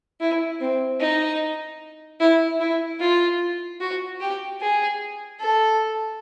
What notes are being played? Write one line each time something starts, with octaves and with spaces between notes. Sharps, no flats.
E4
C4
D#4
E4
E4
F4
F#4
G4
G#4
A4